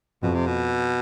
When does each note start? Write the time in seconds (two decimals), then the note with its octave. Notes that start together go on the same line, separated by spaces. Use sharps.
0.23 F2 B2
0.35 C3
0.47 B2